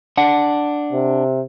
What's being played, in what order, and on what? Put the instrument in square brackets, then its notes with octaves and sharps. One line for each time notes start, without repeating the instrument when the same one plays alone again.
[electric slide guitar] D4 F#5
[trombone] C3